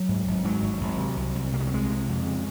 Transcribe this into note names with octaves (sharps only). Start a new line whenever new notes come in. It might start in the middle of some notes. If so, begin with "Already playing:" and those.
Already playing: F#3
G#2
G#1
G#2 F#3
G#1
G#1
C3
C2
C2
C3 A#3
G#3
F#3
C2 G#3
C3
F2
C#3